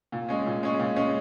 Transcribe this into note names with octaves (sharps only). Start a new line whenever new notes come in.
A#2
G#3 C#4
A#2
G#3 C#4
A#2
G#3 C#4